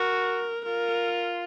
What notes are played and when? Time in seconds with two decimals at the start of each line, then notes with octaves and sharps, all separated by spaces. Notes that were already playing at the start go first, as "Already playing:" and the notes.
Already playing: F#4 A#4
0.65 F4 A#4